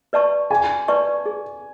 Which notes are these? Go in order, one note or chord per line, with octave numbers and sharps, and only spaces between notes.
B4 D5 A5 C#6
G#4 G#5
B4 D5 A5 C#6
G#4